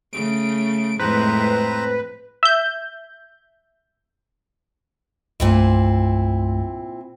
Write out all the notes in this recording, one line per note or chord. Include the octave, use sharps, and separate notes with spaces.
C#3 A3 D7
F2 A2 G#3 C4 B4 C5 A#5
E5 G6
C2 G2 A#2 A3 C4 E4